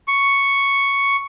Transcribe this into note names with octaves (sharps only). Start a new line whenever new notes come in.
C#6